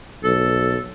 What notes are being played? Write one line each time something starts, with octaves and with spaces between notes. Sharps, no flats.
B1 A4